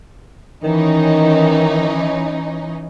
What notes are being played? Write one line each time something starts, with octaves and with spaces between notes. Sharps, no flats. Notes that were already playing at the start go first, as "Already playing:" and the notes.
D#3 E3 C#4 D#4